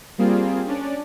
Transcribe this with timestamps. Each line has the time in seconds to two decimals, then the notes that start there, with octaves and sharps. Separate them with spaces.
0.18 G3 A#3 C4 F4 G#4
0.67 C#4 D4 D5